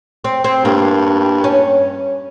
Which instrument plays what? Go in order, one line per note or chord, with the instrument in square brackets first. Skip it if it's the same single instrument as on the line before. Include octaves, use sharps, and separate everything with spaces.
[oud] C4
C4
[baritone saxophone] G2 [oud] A#3
[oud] C#4